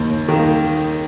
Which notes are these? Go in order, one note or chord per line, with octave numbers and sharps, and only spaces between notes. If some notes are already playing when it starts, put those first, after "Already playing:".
Already playing: D#2
D#3 A#3